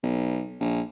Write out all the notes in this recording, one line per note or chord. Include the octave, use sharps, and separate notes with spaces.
B1
A#1